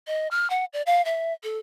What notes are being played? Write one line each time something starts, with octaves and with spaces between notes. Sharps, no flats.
D#5
F6
F#5
D5
F5
E5
A4